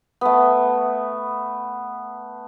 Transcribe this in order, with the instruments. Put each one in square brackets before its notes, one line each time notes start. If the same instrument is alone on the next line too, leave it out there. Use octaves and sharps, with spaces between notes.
[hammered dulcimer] A3 B3